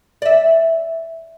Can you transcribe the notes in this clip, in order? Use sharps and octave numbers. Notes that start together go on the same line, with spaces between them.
D5 E5